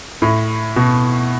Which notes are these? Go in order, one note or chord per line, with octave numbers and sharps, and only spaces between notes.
A2
B2